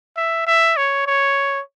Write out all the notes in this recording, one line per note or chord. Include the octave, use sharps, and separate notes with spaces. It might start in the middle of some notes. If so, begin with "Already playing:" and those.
E5
E5
C#5
C#5